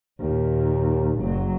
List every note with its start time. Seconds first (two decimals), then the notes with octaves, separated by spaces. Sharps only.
0.20 D#2 A#2
1.21 F#1 F#3